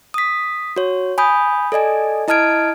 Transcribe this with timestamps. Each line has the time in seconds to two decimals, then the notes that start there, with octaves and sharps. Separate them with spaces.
0.14 D#6 B6
0.76 F#4 C#5
1.18 G#5 B5 D#6 G6
1.72 A4 D5 D#5 G#5
2.28 E4 D#5 A5 F6 G#6 D7